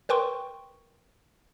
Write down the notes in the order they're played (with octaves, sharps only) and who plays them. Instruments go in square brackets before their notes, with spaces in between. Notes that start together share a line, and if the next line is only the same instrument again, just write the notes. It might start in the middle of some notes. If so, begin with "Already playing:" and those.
[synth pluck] A#4 B4 G5 C6 C#6